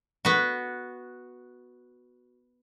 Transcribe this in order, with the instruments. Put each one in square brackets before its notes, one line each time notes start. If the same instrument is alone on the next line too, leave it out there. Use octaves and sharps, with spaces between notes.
[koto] B3 F#4